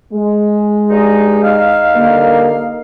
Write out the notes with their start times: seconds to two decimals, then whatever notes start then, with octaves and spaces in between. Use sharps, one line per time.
0.12 G#3
0.89 G2 D#4
1.43 D#4 F5
1.95 D3 G3 A#3